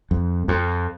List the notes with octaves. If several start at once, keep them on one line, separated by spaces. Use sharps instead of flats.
F2
F2